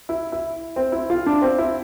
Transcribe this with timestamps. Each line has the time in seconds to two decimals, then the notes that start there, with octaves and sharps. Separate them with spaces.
0.09 E4
0.32 E4
0.76 C4
0.92 E4
1.10 F4
1.26 D4
1.42 C4
1.58 E4